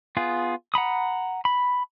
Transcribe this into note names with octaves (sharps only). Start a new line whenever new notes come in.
B3 F4 G#4
F#5 A#5 B5 D#6
B5